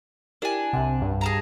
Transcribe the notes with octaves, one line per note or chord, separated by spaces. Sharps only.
D4 E4 G4 A#4 G#5
C2 C3 F#5
G2
G#4 A5 A#5